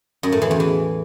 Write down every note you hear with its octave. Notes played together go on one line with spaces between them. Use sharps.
F#2
A2
E3
E2
E3